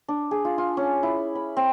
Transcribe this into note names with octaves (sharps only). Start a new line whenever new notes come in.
D4
G#4
F4
F4
C#4
E4
B5
C4